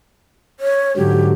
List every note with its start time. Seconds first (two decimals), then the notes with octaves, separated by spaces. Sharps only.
0.60 C#5
0.97 G#2 D3 F#3 G4